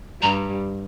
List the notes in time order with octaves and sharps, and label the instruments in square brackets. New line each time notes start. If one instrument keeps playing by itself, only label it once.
[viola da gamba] G2 G3 [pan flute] A#5